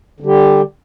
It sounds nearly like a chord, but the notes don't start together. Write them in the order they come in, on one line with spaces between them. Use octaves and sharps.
D3 G3 G4